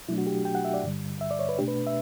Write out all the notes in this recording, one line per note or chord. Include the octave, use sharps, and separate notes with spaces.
B2 F#3 A3 D4 E4
F#4
G4
G5
F#5
E5
D5
G2 D3 G3
E5
D5
C#5
B4
B2 A3 D4 G4
B4
E5